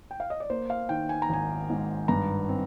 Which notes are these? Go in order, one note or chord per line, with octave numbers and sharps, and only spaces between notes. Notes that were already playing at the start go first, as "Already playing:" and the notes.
G5
F5
D#5
D5
A#3 C5
F5
D#3 G5
G#5
A#5
G#1 G#5
G#2
G2 A#5
C4